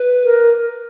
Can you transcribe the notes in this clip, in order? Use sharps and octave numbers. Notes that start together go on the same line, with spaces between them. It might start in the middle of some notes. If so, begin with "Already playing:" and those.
Already playing: B4
A#4